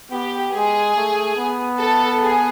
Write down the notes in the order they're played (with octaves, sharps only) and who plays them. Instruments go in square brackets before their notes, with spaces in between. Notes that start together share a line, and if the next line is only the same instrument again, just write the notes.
[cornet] B3 [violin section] G4
[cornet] G#3 [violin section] G#4
[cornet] A3
B3
[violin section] A4
G#4